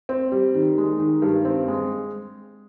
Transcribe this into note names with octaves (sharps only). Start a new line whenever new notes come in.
C4
G3
D#3
G#3
D#3
G2
C4
G#3